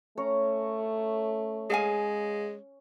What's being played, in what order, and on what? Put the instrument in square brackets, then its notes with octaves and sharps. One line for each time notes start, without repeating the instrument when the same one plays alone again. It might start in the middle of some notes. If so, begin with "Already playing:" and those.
[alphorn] A3 [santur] C#4 C#5 A#5
[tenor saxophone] G#3 [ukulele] G#4 F5 G#5